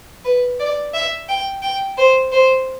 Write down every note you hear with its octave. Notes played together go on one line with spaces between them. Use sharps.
B4
D5
E5
G5
G5
C5
C5